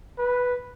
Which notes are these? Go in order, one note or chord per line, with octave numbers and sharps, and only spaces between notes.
B4